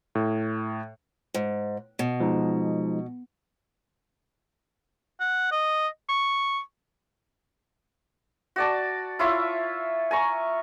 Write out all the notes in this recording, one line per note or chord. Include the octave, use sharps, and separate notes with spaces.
A2
G#2
B2
F3 G#3 D#4
F#5
D#5
C#6
F#4 D5 A5
E4 F4 C#5 E5
G#5 A#5 C#6